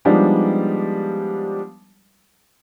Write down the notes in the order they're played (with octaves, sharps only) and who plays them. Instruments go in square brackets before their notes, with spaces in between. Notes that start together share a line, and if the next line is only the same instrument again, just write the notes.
[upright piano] F3 G3 G#3 B3 D4 D#4